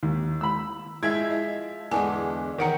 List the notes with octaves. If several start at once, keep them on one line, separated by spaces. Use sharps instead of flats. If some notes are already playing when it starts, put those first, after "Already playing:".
D#2
B5 E6
F3 G#3 E4 E5 G#6
D#5
E2 D3 G#3 G#5 A5
D#3 E3 F#5 A#5 C#7